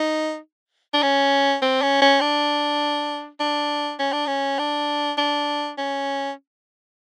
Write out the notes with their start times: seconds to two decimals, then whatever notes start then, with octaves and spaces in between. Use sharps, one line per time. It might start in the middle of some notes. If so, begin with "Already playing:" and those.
Already playing: D#4
0.94 D4
1.03 C#4
1.62 C4
1.82 C#4
2.02 C#4
2.21 D4
3.40 D4
4.00 C#4
4.13 D4
4.27 C#4
4.59 D4
5.18 D4
5.78 C#4